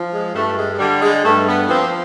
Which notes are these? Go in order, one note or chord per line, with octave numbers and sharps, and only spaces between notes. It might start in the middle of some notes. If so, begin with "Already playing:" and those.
Already playing: F3
G#3
G2 A3
G#3
G#3
D3 G3
G#3
G2 A3
B3
F3 C4